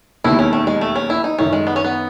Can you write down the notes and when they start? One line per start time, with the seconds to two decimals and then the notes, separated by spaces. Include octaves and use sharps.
0.24 E1 D#2 D#3 E4
0.39 C#4
0.53 A3
0.67 G#3
0.81 A3
0.96 C#4
1.10 E4
1.24 D#4
1.39 F#2 D#3 A3 C#4 D#4
1.53 G#3
1.67 B3
1.76 C#4
1.84 B3